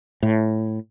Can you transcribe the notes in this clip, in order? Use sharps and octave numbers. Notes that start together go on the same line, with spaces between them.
A2